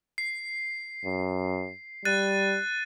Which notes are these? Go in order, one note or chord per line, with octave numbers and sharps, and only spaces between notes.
C7
F#2
G3 F#6 A6 D#7